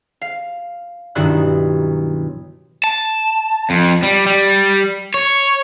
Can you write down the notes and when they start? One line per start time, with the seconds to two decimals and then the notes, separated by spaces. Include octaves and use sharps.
0.21 F5
1.15 B1 G2 D#3 E4 F#6
2.84 A5
3.70 F2
4.03 G3
4.26 G3
5.14 C#5